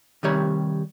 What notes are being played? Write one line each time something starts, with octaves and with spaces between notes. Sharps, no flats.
C3 D#3 G3 C#5